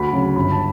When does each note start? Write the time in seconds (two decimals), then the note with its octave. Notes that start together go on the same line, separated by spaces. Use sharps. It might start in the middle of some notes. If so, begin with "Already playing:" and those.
Already playing: D2 B5
0.13 C#3 F#3
0.36 G1 B5
0.52 A5